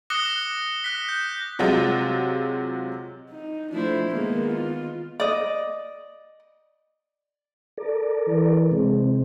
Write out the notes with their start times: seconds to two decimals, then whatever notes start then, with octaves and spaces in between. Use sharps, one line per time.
0.10 D6 D#6 F#6 A#6 C#7 G7
0.84 F#6 B6
1.09 G6
1.59 C3 F#3 G#3 F4
3.31 D#4
3.72 F3 A3 D4 E4 C5
4.10 D#3 G#3 A#3 B3
4.52 F4
5.20 D5 D#5
7.78 A4 A#4 D5
8.27 E3
8.71 C3 G#3 C4